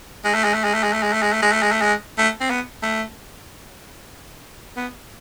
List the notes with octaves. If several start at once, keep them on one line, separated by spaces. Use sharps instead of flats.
G#3
A3
G#3
A3
G#3
A3
G#3
A3
G#3
A3
G#3
A3
G#3
A3
G#3
A3
G#3
A3
C4
B3
A3
B3